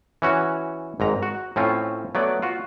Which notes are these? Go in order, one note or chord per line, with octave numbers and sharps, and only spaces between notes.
E3 C#4 F#4
G#1 G#2 A#5
F#4
A2 C4 C#4 F4
F#3 A3 B3 D5 F#5
F4 F#4